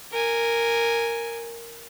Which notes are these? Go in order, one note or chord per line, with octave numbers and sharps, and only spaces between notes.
A#4 G#5